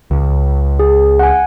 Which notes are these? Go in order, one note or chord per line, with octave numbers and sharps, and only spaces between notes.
C#2
G#4
F#5 G#5